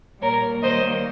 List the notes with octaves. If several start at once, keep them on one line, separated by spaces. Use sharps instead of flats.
A#2 G3 A#3 A#4 C#5
D#3 G3 A#3 C5 D#5